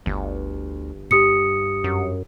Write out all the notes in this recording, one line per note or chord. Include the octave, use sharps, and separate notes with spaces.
G1 D2
G2 G4 D#6 C#7
F#2